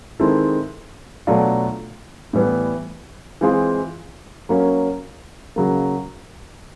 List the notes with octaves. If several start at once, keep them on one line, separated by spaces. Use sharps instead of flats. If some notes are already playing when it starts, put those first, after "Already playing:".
D#3 G#3 C4 E4 A4
B2 F#3 A3 D4 F4
A2 E3 G3 B3
E3 G#3 C4 F4 G#4
F#3 A#3 C#4
C#3 F#3 A#3